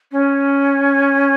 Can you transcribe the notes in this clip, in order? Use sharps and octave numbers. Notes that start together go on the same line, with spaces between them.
C#4